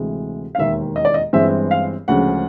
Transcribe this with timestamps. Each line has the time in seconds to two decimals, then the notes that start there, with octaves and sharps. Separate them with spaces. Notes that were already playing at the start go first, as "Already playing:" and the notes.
Already playing: D2 C3 E3 G#3
0.55 F5
0.58 E1 D#2 D#3 E5
0.96 D#5
1.05 D5
1.14 D#5
1.33 G1 G2 E3 G#3 C4 E5
1.71 F5
2.08 D2 C#3 F3 G#3 F#5